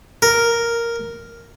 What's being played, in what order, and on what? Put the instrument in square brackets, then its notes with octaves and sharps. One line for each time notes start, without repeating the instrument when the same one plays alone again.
[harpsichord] A#4